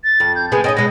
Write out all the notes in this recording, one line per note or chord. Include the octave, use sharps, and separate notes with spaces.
A6
F2
G6
C3 G#3 B3 G#5
C4 C#4 D#4 D#5
B2 G#3 A#6